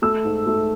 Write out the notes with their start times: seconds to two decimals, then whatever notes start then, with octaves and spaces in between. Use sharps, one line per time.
0.02 A3 E6
0.24 G#2
0.47 A3